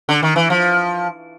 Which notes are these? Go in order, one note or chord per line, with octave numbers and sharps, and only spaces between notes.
D3
D#3
E3
F3